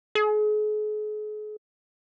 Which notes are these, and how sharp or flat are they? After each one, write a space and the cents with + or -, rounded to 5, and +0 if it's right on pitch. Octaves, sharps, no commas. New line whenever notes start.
G#4 +40